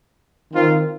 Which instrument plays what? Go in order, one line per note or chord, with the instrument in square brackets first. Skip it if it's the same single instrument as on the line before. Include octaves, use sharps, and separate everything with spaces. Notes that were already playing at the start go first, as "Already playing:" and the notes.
[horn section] D#3 C4 F4